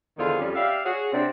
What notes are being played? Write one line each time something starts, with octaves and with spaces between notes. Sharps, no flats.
E2 D3 D#3 F4 G#4 C5
F2 G3 C#4
G4 D5 E5 F5
F#4 G#4 C#5
C3 C4 D4